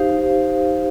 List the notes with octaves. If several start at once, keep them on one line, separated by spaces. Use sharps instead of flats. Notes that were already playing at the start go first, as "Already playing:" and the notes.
Already playing: D#4 G4 C5 F5